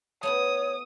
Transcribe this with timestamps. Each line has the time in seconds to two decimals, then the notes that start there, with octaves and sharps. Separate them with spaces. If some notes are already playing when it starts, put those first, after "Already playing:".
0.23 A3 B3 E4 C#5 D#6